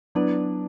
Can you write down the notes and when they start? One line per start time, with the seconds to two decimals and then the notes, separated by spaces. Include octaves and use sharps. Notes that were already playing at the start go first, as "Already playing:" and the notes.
0.15 F#3 B3 D4 E4 B4 D5